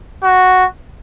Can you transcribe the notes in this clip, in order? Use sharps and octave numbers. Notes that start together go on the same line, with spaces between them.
F#4